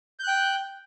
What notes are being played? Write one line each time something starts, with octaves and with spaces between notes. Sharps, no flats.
G5 F#6 G6